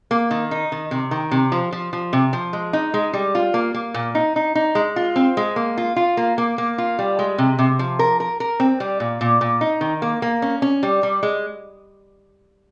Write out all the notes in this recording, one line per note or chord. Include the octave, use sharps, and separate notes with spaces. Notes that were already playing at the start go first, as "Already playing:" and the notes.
A#3
D#3
D#4
D#3
C3
D#3
C3
F3
F3
F3
C3
F3
G#3
D#4
G#3
G3
F4
A#3
A#3
A#2
D#4
D#4
D#4
G#3
F4
C4
G#3
A#3
F4
F4
A#3
A#3
A#3
F4
G3
G#3
C3
C3
F3
A#4
A#4
A#4
C4
G3
A#2
A#2
A#2
D#4
D#3
A#3
A#3
C#4
C#4
G3
G3
G#3